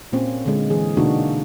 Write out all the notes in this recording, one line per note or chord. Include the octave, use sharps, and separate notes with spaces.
A#2 A#3 C4 C#4
D3 G#3
E3 G#4
B2 D3 A#3 D4 D#4 F#4